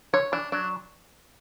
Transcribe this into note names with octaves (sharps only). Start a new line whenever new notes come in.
D3 C#5
E3 D4
F#3 D4